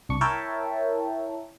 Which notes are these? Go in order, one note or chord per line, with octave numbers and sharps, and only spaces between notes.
C2 D4 C#6
E4 A#4 C#5 E5 G5 A5